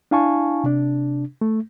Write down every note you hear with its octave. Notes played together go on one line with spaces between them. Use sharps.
D4 E4 F5 G#5 A5 C#6
C3 D4
A3